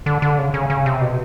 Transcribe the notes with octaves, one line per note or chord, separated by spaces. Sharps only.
D3
D3
C#3
C#3
C#3
C3
B2